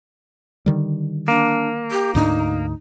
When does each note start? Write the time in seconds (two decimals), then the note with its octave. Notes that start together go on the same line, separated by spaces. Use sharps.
0.66 D3 D#3 G3
1.28 A#3 D4
1.91 G4
2.15 D2 G#2 D4 D#4